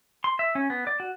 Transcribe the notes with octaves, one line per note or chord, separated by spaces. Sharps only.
C6
E5
C#4
B3
D5
F#4